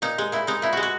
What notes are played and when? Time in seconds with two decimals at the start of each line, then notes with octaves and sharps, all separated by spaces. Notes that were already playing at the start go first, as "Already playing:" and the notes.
0.02 A#2 D#4
0.18 G#3
0.32 A#2 E4
0.47 G#3 D#4
0.62 A#2 E4
0.73 G#3 F#4
0.83 F#4